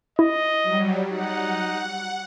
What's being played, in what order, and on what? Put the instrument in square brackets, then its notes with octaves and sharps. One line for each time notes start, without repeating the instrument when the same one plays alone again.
[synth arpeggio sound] E4 [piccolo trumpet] D#5
[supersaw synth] F#3 G3
[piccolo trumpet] D#4 [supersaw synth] F#5